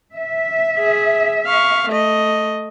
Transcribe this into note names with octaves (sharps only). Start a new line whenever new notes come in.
E5
G#4
F5 C#6
A3 D#5